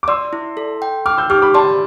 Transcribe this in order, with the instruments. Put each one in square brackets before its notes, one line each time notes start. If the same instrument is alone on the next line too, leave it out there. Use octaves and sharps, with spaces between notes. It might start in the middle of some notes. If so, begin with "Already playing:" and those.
[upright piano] D6
[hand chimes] D5 [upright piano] C6 E6
[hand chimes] E4
A4
G5
[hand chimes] G5 [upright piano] D6 F6
[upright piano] E6 G6
[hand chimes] G4 [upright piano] D6 F6
[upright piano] B5 D6
[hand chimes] D5 [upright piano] A5 C6